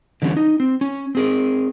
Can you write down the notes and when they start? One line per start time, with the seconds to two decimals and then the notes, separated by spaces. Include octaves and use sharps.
0.22 D3 E3 G3 B3 C#4
0.37 D#4
0.60 C4
0.81 C#4
1.15 C4 G#4 A#4